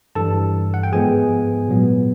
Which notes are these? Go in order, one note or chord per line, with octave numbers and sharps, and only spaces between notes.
G2 E3 G3 A4 A5
F#5
G5
G#2 F3 G#3 B3 G#4 G#5
A#2 F#3 B3